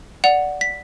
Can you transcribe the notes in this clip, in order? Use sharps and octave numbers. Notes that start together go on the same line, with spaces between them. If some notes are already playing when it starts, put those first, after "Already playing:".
D5 F#5 F7
B6